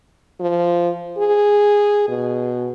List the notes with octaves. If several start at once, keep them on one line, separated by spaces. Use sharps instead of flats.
F3
G#4
B2